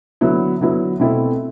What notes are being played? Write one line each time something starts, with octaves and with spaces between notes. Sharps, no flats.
D3 F#3 B3 E4
D3 F#3 B3 E4
B2 A3 C4 E4 A4